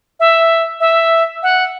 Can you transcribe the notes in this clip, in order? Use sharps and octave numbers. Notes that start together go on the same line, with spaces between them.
E5
E5
F#5